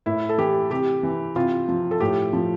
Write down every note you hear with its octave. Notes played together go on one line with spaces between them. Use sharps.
A2 E4
A4
E3 G4
C3 G4
E3
C3 F4
F3
A4
A2 G4
F3